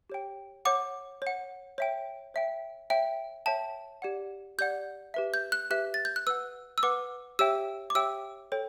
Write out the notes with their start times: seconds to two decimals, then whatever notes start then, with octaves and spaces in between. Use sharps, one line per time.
0.10 G4 C#5 G5
0.65 C#5 F#5 D6
1.22 C#5 F#5
1.78 C#5 E5 G5
2.34 C#5 E5 G5
2.90 C#5 E5 G5
3.46 C#5 E5 G5 A5
4.02 G4 D5 F#5
4.58 G4 D5 F#5 G6
5.14 G4 B4 E5
5.34 G6
5.52 F#6
5.70 G4 B4 E5 F#6
5.94 A6
6.05 G6
6.16 F#6
6.27 B4 F#5 E6
6.78 E6
6.83 B4 F#5 D6
7.39 G4 C#5 E5 G5 E6
7.90 D6
7.95 G4 C#5 E5 G5 E6
8.52 A4 C#5 G5